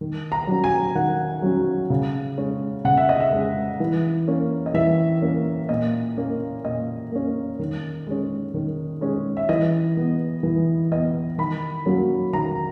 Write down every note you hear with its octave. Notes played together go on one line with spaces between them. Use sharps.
D#3
A#5
F#3 C#4
G#5
D#3 F#5
F#3 C#4
C#3
G#3 C#4
C#3 F#5
E5
D#5
E5
G#3 C#4
E3
A#3 C#4
D#5
E3 E5
A#3 C#4
A#2 D#5
A#3 C#4
A#2 D#5
A#3 C#4
D#3
G#3 C#4
D#3
G#3 C#4
E5
E3 D#5
B3
E3
B3 D#5
D#3 B5
F#3 A#3 C#4
D#3 A#5